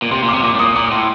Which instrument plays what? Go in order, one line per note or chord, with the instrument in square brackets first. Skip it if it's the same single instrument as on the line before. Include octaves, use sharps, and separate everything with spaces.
[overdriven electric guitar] A#2
[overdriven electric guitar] C3 [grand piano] C6
[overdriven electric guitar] A#2
[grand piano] D6
[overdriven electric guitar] C3
[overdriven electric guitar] A#2 [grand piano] D6
[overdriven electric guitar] A2
[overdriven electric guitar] A#2 [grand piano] D#6
[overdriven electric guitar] A#2 [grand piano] D6
[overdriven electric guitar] A2 [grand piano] C6